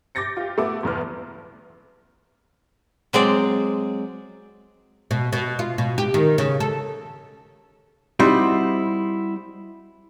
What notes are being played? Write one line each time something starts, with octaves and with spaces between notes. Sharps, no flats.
D6 G6 A6 A#6 C#7
F4 G4
A3 B3 D6
G1 E2 B4 F6
F#3 G#3 C4 D5
B2
B2
F4
B2
G4
D#3
C#3
A4
G3 C4 D#4 E4 F#4